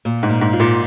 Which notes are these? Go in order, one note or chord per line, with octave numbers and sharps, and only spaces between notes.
A#2
G#2
A#2
G#2
F4
A#2